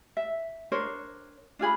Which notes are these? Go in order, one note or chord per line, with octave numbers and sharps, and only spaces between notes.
E5
D4 A#4 C5 C#5
D4 F4 G#4 B5